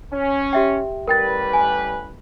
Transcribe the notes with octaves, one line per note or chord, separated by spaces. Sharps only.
C#4
G4 E5 G5
A1 G3 A#4 B4 G5 A6
G#5